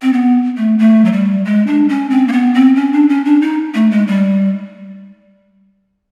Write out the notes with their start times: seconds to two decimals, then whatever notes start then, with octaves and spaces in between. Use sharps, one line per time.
0.02 C4
0.13 B3
0.57 A3
0.79 A3
1.05 F#3
1.12 G3
1.45 G#3
1.67 D4
1.89 C#4
2.10 C4
2.28 A#3
2.32 B3
2.54 C4
2.76 C#4
2.93 D4
3.09 C#4
3.25 D4
3.41 D#4
3.74 A3
3.91 G#3
4.07 G3